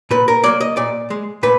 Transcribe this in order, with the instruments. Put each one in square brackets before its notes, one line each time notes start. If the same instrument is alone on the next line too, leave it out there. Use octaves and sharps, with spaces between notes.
[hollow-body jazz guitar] A#2 B4
A#4
F#3 A#3 D5
D#5
A#2 D5
G#3
A#2 B4